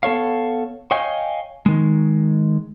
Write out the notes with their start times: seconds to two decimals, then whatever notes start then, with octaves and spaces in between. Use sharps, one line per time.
0.03 B3 A4 C#5 F5
0.91 C#5 D#5 F5 G5 G#5
1.66 D#3 G#3